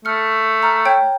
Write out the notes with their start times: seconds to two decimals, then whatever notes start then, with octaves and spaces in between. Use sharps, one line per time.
0.05 A3 F6 C#7
0.63 A#5 F6
0.86 C#5 G5 G6